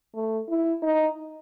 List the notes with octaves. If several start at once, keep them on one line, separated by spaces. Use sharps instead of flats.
A3
E4
D#4